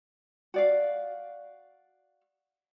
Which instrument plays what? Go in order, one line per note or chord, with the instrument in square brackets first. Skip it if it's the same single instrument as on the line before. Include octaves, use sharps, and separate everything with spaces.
[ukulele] F#4 D5 F5